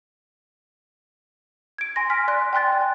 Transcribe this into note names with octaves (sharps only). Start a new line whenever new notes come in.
G#6 D7
G#5 C6 A#6
G#5 F6 B6
D5 C6 F#6
G5 G#5 C6 F#6 A6
D5